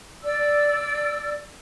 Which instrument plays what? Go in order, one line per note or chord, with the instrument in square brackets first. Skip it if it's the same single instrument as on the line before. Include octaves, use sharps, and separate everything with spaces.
[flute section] D5 E6